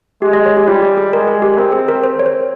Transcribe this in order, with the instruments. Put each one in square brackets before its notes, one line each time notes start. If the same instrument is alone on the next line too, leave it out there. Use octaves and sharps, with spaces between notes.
[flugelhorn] G#3 [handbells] G4
[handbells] D#5
C#5
G4
[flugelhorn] G3 [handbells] F4
[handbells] G4
G#4
[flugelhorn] G#3 [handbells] A#4
[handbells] G#4
G4
[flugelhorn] C4 [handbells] A#4
[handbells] G#4
A#4
C5
C#5
C5